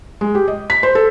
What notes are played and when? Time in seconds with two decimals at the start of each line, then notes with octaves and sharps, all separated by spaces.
0.21 G#3
0.35 G4
0.48 D#5
0.70 B6
0.83 C5
0.95 A4